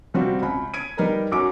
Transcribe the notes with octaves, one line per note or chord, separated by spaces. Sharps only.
C3 G3 C4 F4 F#4
C#2 B5
G#6 D7 D#7
G3 D#4 A#4 B4
F#2 F#4 D6 D7